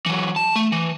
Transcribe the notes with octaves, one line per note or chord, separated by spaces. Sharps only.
E3 F#3
A5
A3
E3